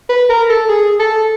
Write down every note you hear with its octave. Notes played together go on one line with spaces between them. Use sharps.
B4
A#4
A4
G#4
A4